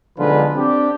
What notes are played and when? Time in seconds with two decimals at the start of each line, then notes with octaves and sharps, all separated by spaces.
0.17 B1 D3 F3 G#3 F4 B4
0.56 C4 D4 G4